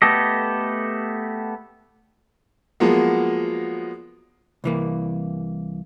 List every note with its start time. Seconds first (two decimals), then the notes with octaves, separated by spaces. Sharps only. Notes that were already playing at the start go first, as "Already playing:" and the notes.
0.02 A3 B3 G4 A4 D#5
2.80 F3 F#3 G#3 A#3 B3
4.64 C2 E3 A#3